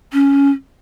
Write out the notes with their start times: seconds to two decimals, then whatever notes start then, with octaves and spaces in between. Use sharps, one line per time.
0.13 C#4